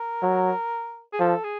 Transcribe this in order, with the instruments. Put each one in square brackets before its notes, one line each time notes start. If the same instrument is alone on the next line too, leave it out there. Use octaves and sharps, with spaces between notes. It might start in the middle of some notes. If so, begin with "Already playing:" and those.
Already playing: [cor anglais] A#4
[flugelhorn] F#3
[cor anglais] G#4
[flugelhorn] F3 [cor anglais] A4
[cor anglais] G#4